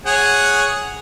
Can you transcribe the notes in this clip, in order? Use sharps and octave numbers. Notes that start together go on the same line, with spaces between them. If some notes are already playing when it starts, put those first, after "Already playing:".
G#4 C#5 F#5